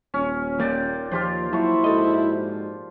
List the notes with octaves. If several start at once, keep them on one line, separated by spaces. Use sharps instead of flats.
D#1 C#4
A#2 A#3 D5 G5
D#2 F3 F4 G4 C5
F3 F#3 E4 C#6
G#2 F#4 A4 D#5